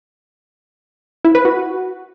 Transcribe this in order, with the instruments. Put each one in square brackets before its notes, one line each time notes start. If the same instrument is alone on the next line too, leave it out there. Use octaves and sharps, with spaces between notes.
[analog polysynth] E4
B4
F#4